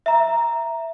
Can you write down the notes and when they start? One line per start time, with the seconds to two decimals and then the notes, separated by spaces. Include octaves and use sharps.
0.06 E5 A#5